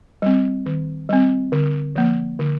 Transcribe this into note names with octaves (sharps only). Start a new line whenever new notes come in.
G3 C4
D#3
G3 C4
D3
F3 A#3
D3